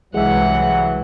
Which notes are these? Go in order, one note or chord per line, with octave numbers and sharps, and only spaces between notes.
C2 E3 F#3 G#3 E5 F#5